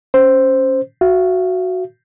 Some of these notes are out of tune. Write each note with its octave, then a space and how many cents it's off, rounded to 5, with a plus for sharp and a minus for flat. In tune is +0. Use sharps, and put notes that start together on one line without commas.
C#4 +0 C5 +0
F#4 -5 E5 +45